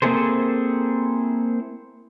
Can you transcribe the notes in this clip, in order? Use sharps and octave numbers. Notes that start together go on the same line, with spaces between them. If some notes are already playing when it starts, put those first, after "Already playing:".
A#3 C4 E4 G#4 A4 C5